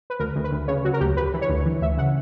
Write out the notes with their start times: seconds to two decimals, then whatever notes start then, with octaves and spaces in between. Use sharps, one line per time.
0.10 B4
0.19 D2 A#4
0.35 D2
0.44 B4
0.52 D2
0.68 C#3 C#5
0.85 F#3 F#4
0.93 A#4
1.00 D2 G4
1.17 D2 B4
1.33 E3
1.41 C#5
1.49 D2
1.65 E3
1.81 D2 E5
1.97 C#3 F#5